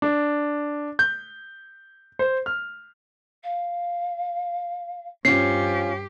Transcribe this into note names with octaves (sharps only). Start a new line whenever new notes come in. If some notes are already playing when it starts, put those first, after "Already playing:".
D4
G6
C5
F6
F5
G2 C#4 F4 G4 C5 C7